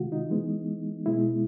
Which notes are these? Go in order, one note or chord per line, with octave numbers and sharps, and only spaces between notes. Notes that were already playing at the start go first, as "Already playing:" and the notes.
Already playing: C3 D#3 G#3 F4 F#4
D#4
E3 G#3 B3
B2 G#3 B3 E4